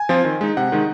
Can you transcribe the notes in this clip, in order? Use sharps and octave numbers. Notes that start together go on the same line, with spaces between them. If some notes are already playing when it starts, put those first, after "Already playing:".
Already playing: G#5
F3 C4 F4
D#3
G#3 D#4
C3 F#5
D#3 G#3 D#4